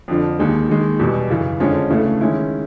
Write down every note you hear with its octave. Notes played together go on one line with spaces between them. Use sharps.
F2 D3 F3
D#2 D#3 G#3
D#2 D#3 G#3
E2 B2 G3
F#2 C#3 E3
F2 D3 F3 G#3 C#4
D2 C#3 E3 A3
D#3 G#3 C#4 E4